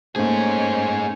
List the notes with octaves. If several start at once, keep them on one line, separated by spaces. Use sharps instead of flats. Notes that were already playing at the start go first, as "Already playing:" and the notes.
A3 A#3 C#4 D#4 G#4 C5 C#5